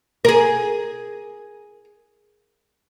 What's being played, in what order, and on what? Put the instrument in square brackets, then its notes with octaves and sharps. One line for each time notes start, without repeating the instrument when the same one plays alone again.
[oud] G#4 A#4